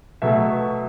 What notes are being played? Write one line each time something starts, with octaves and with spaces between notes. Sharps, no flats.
B2 F#3 A3 E5